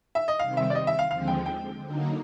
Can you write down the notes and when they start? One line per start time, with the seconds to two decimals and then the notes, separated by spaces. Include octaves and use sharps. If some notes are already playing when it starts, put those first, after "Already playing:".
0.15 E5
0.28 D#5
0.39 C3 D#3 G3 C4 F5
0.57 E5
0.70 D5
0.75 D#5
0.87 E5
0.99 F5
1.10 D#2 D3 F3 G#3 C4 F5
1.28 G5
1.46 G5
1.82 D3 F#3 A#3 D#4